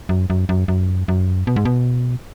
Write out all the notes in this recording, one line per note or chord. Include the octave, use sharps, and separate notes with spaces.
F#2
F#2
F#2
F#2
F#2
B2
G#2
B2